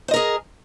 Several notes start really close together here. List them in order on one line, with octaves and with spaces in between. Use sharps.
C5 D#5 A#4 G#4